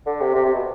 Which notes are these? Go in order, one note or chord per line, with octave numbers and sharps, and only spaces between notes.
D3
C3
C3
C3
B2